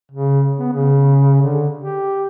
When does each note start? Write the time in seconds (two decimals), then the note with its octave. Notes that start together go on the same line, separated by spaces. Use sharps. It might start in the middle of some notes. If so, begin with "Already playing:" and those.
0.11 C#3
0.58 B3
0.73 C#3
1.42 D3
1.78 G4